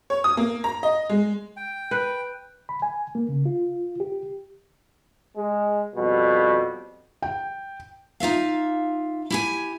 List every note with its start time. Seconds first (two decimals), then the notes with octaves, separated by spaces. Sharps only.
0.10 C#5
0.24 D#6
0.37 A#3
0.64 A#5
0.83 D#5
1.10 G#3
1.57 G5
1.91 B4
2.69 B5
2.82 G#5
3.15 A#3
3.29 C#3
3.46 F4
4.00 G4
5.36 G#3
5.96 F2 B2 G3
7.22 G5
8.20 D#4 F4 E5 F5
9.30 E4 G4 G#5